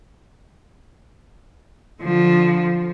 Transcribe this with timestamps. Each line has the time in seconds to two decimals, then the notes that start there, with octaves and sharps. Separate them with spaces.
2.02 D3 F3